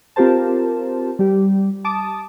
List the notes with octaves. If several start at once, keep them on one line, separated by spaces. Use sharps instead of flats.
C4 F4 G4 A#4 C5 A5
G3 G4
A5 D6 D#6